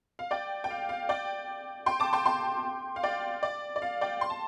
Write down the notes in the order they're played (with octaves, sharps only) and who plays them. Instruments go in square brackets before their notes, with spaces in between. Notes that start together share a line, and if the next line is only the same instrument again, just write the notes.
[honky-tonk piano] F5
D5 G5
G5
F5
F5
D5 G5
G5 C6
A5 D6
G5 C6
G5 C6
F5
D5 G5
D5
D5
F5
D5 G5
C6
A5